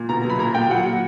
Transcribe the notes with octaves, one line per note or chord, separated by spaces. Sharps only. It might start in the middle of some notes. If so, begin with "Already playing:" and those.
Already playing: A#2
B2 A#5
F#3 B5
A#2 A#5
A#2 G5
F#3 F#5
F#3